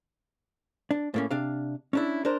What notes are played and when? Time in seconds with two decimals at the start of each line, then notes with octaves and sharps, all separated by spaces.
0.91 D4
1.14 A2 A#3 C#4
1.31 C3 D4 F5
1.93 C#4 D4 E4
2.25 D4 A#4 C5